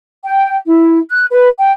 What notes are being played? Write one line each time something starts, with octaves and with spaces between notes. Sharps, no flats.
G5
E4
F#6
B4
G5